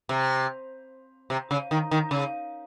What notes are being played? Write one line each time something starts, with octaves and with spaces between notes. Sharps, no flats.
C3
C3
C#3
D#3
D#3
C#3